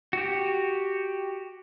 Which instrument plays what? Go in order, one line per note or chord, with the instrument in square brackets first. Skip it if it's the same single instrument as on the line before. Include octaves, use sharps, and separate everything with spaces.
[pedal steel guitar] F#4 G4